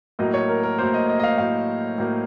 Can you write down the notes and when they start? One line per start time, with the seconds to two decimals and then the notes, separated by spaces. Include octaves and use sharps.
0.19 A2 F#3 A#3 D#5
0.34 C#5
0.49 A#4
0.63 A#4
0.79 A2 F#3 A#3 C5
0.94 D#5
1.09 D#5
1.19 D#5
1.23 F5
1.38 A2 F#3 A#3 F5
1.98 A2 F#3 A#3